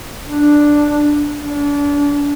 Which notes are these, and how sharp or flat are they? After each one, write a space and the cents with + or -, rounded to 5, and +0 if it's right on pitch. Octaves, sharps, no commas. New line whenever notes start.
D4 +0
D4 -30